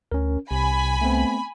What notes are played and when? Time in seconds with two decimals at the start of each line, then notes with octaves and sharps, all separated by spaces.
0.12 D2 C#4 A#4
0.51 C2 C3 G#5 B5
1.01 A3 B3 C4